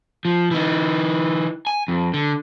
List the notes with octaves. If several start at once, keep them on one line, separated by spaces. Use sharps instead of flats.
F3
E3 D#4
G#5
F2
D3